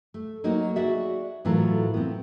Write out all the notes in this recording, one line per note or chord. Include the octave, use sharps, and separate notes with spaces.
A3
F#3 A#3 D#4 F#4
F#4 G#4 D5 E5
A2 E3 F#3 F4 A4 A#4
B3 C4